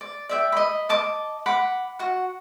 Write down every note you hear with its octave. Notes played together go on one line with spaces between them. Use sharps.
D5
D5 E5 G5
D#5 B5
D#5 A5 D6
F#5 B5 D6
F#4 F#5